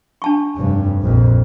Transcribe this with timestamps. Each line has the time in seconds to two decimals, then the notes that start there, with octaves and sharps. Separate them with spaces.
0.22 D4 A5 C#6
0.55 F1 G2
1.03 A#1 F2